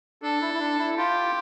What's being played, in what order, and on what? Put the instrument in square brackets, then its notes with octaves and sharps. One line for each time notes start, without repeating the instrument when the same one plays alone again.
[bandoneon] D4 [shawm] A4
[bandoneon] E4
E4
D4
E4
[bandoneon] F4 [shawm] G4